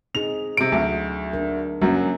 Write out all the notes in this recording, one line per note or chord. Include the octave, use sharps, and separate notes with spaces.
C4 D#4 G#4 F7
C3 D7
D2 F#3
D4 A#4
F#2 F#3 A#3 C#4